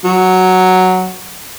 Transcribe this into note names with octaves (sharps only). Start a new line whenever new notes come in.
F#3